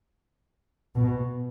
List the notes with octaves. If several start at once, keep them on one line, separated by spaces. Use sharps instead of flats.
B2